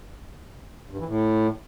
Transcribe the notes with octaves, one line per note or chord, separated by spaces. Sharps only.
G2
E3
A2